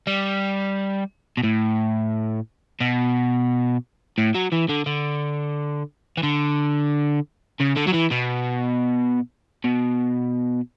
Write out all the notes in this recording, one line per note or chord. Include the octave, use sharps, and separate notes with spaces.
G3
B2
A2
B2
A2
F#3
E3
D3
D3
E3
D3
C#3
D3
F#3
E3
B2
B2